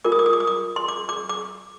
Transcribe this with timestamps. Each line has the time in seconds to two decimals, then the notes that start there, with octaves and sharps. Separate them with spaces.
0.04 F4 A#4 D6
0.12 D#6
0.19 D6
0.26 D#6
0.33 D6
0.40 D#6
0.47 D6
0.76 C6
0.88 D6
1.09 D6
1.29 D6